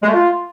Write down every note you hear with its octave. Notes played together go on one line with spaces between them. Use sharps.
G#3
A3
F4